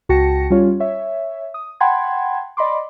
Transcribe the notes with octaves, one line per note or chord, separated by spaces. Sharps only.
C#2 F#4 G5 A5 A#6 C#7
G3 C#4 F4 C#5
C#5 E5
D#6
F#5 G5 A5 B5 C6 G#6
D5 D#5 B5 C6 D6